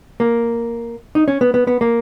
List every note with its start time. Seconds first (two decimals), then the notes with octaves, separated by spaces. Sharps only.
0.20 A#3
1.15 D#4
1.28 C#4
1.41 B3
1.54 B3
1.67 B3
1.81 A#3